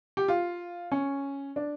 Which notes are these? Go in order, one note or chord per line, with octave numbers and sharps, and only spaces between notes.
G4
F4
C#4
D4